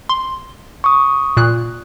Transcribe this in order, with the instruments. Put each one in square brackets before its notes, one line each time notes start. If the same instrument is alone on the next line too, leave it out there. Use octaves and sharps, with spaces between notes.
[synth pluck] C6
[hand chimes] C#6 D#6
[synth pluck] A#2 F#6